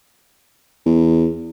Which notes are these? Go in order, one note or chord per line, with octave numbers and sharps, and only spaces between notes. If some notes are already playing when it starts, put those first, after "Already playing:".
E2